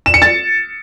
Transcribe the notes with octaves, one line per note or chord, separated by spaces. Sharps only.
E7
C#7
A6